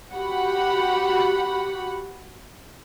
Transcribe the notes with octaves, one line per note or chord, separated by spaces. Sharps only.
F#4 G4 F#5 B5